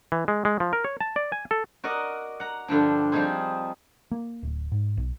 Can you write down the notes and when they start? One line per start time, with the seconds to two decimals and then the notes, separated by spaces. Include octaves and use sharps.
0.12 E3
0.28 G#3
0.45 G#3
0.60 F3
0.73 A#4
0.84 C#5
1.00 A5
1.16 D5
1.32 G#5
1.51 A4
1.84 F#4 A#4 D5 D#5 F#5
2.40 F#5 A#5
2.68 G2 D3 F3 D4
3.12 F3 G3 C4 D#4 G#4 C5
4.11 A#3
4.43 D1
4.72 G#2
4.97 B1